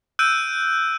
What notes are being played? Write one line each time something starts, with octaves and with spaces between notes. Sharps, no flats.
E6 F#6 G6 D7 D#7